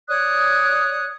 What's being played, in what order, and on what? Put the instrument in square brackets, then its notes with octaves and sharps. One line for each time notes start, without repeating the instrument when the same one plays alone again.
[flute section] C#5 D5 D#6 F#6